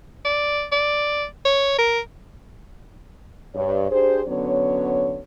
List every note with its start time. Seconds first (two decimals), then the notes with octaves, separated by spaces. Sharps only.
0.25 D5
0.72 D5
1.45 C#5
1.78 A#4
3.55 G2 C#5
3.91 D4 G4 G#4 C5
4.28 D3 F#3 B3 C#4 C#5